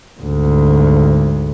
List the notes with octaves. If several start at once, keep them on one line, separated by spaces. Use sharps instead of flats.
G#1 D2